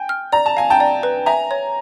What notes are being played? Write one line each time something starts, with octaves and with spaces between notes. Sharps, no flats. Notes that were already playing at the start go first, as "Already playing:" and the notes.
Already playing: G5 G#5
F6
D5 A#5
A5
F5 G#5
G5 A5
D5
B4
E5 G#5 A#5
C#5